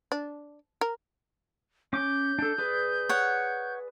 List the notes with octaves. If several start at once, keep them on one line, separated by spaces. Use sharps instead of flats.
D4
A#4
C#4 D6 G6
D4 A4
G#4 B4 D5
C#5 F#5